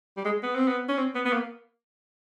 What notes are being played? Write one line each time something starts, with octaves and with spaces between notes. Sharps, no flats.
G3
G#3
B3
C4
B3
C#4
C4
B3
B3
A#3